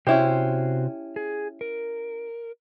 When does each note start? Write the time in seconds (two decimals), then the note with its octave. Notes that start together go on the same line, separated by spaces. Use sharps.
0.07 C3 C#4 E4 F#4 G4 C5
1.16 G#4
1.61 A#4